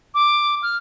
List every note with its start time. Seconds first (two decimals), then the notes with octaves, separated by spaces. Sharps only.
0.14 D6
0.63 F6